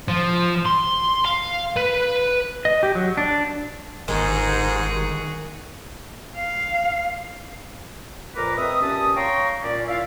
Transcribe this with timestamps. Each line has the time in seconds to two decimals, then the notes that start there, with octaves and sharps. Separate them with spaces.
0.08 F3
0.66 C6
1.25 F5
1.77 B4
2.65 D#5
2.83 G4
2.95 F#3
3.17 D4
4.08 G1 G#2 D#3 F#4 G#4
6.37 F5
8.36 F2 A#2 A#4 B4 A#5 D6
8.57 G#3 C4 B4 E5 D#6
8.81 A#2 C#4 G4 A5 D#6
9.16 C#5 F5 G5 A#5 C6 C#6
9.62 A#2 C#4 D5
9.88 E4 F4 D5 E5 F5